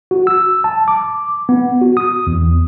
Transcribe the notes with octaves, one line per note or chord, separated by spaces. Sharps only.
F#4
E6
A5
D6
B3
F#4
D#6
E2